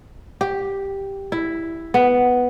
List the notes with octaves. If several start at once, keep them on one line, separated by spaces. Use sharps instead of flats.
G4
E4
B3